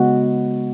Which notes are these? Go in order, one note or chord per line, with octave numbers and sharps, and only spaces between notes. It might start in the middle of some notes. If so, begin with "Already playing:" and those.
Already playing: C#3 G#3 B3 F#4